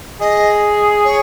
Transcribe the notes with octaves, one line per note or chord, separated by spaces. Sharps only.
G#4 D#5
C#5